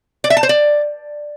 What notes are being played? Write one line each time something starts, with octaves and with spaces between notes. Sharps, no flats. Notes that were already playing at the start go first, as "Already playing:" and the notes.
D5
E5
A5
C5
D5